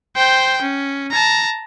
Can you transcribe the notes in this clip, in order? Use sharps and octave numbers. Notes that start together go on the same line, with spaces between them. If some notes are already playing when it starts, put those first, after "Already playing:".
C5 G5
C#4
A5 A#5